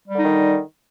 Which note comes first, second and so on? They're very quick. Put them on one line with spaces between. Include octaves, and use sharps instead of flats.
G3 D3 D#4 D#3